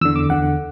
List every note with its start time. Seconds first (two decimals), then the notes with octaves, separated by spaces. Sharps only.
0.01 E2 D3 E6
0.16 D6
0.29 E2 D3 F#5